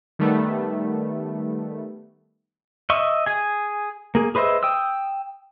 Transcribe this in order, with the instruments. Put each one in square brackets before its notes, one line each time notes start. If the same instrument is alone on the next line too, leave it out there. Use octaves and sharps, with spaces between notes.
[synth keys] D#3 G3 A3 B3
[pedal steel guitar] D#5 E5 C#6
G#4 G#5
A#3 G#4
G#4 B4 C5 D#5 E5
G5 D#6 E6